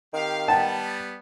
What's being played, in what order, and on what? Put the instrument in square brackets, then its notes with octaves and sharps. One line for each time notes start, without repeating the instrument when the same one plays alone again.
[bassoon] D#3 [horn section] C4 G4 F5
[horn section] G3 B3 [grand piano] F#5 G5 [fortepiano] A5